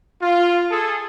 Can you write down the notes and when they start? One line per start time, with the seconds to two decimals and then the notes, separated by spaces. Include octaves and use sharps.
0.22 F4
0.70 G#4 A4